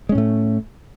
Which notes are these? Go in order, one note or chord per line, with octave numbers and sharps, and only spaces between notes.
A2 G#3 A3 C#4